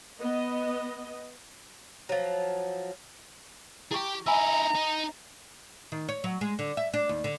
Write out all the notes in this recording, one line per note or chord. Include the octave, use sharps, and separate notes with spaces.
B3 D#5
F3 F#3
E4 G4 G#4 C#6
D#4 E4 G#5 A#5 B5 E6
D#4
D#3
C#5
F#3
G#3
D3
E5
D4
D#2
D3